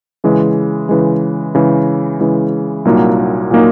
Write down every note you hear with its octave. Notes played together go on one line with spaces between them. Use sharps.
C#3 E3 G#3
C#3 E3 G#3
C#3 E3 G#3
C#3 E3 G#3
C2 A#2 F#3 A#3 D#4
A#2 F#3 A#3 D#4